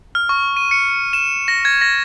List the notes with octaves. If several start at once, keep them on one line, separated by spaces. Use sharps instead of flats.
F6
C#6
D#7
C#7
E7
A#6
G#6
A#6